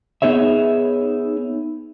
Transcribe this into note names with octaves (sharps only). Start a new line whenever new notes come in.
B3 D#4 G#4 C#5 E5